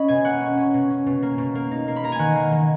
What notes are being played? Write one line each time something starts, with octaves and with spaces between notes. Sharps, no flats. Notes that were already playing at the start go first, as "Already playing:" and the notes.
Already playing: C#4 D#5 B5
B2 G#5
A#3 F#5
C#4
C#4
B2
C#4
B2
A#3
B2
A#3
D#4
A#3
B5
A#3 A#5
G#5
D#3 F#5
A#3
D#3